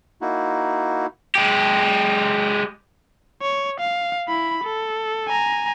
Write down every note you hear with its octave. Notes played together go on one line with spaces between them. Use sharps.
A#3 D#4 E4 F#4
G#3 G4
C#5
F5
E4 B5
A4
G#5 A#5